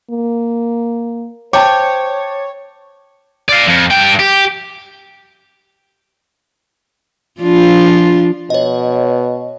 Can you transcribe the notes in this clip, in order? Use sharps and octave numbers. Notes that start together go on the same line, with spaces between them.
A#3
C5 C#5 G5 A5 D6
D5 F5
F2
G2 G5
G4
F3 D4 F4
B2 C#5 D#5